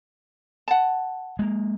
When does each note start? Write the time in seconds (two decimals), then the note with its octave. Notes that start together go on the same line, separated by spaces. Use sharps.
0.68 F#5 A5
1.39 G#3 A#3